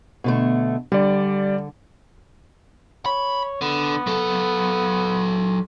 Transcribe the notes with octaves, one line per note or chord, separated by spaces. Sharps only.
B2 D3 A3
D3 G3 D5
C#5 B5
D3 B3
F#3 A4